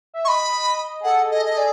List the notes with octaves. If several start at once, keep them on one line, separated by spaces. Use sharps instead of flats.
E5
D#5 B5 C#6
D#5
G#4
A4 F#5
G#4 D#5
D#5
G#4 D5